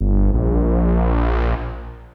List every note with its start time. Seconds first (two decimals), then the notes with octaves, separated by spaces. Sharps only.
0.01 G1
0.34 A#1